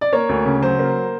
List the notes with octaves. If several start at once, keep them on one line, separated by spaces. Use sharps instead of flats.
D5
A#3 C#5
D2
C#3
F#3 C5
A#3